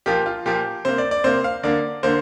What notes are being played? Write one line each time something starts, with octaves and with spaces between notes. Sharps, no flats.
A#2 F3 A#3 G4
F4
A#2 F3 A#3 G4
C3 A#3 C5
D5
D5
C3 A#3 C5
F5
D3 A#3 D5
D3 A#3 C5